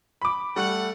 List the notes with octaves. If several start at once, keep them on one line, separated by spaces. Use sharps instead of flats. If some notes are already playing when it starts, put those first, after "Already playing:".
B5 D6
G3 A3 F#5